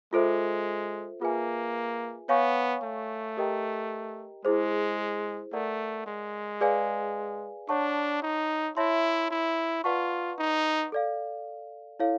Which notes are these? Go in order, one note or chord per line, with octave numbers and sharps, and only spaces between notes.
G#3 F4 A4 C5 E5
A#3 F4 G#4 B4 E5 G#5
B3 C#5 F5 G#5 C#6
A3
G4 A#4 D#5 G5 A#5
G#3 E4 G#4 C5
A3 A#4 D5 F#5 A#5
G#3
G#4 B4 D5 F5 G#5
D4 C#5 F#5 A5 C#6
D#4
E4 C#5 E5 A5 C6
E4
F4 B4 D5 F#5 A5 C#6
D#4
A4 D5 F5
E4 A4 C#5 F5